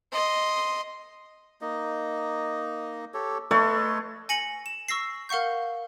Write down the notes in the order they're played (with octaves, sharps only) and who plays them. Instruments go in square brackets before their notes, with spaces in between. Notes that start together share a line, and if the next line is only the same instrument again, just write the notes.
[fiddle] D#5 C6
[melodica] A#3 D#4 D#5
G4 A4 C#5
[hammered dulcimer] A3 A4 C#5 [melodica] B4 D#5 C6
[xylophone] G#5 A#6 C#7 F#7
E7
C#6 E6 A#6 C7
A#4 F5 F#5 C#6 G6